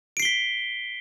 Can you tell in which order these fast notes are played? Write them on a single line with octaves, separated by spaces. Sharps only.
D7 C7 G7 B6